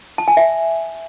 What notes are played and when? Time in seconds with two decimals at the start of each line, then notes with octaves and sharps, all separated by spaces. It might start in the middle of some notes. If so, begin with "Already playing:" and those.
0.18 A5
0.28 G#5
0.37 E5